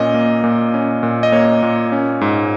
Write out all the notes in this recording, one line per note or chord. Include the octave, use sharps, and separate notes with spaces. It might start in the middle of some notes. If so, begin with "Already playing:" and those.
Already playing: A#2 C#4 D#5
A#3
A#2
C#4
A#2
D#5
A#3 C#5
A#2
C#4
G#2